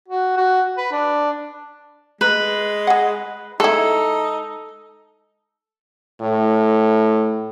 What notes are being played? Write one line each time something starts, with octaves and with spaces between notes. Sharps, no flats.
F#4
F#4
B4
D4
G#3 B4
G#4 F#5
G#3 D#4 E4 A4
A2